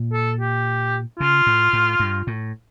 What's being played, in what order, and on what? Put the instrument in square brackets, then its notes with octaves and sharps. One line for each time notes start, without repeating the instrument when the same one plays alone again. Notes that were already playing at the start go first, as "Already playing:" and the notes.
Already playing: [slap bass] A#2
[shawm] A4
G4
[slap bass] C#3 [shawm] F4
[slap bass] A2
A2
G2
A2